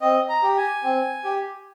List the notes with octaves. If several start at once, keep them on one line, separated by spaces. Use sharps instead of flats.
C4 D#5
A#5
G4
G#5
C4
G4